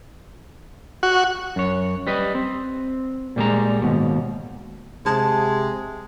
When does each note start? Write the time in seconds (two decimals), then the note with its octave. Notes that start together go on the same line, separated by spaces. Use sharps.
1.03 F#4
1.56 F#2 C#5
2.07 G3 B4 D#5
2.35 C4
3.36 A#2 G3 G#3 A#5
3.82 D#2 G#2 B2
5.06 C3 G#3 A5